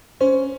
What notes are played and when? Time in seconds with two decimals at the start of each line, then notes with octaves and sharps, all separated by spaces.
0.20 C#4 C5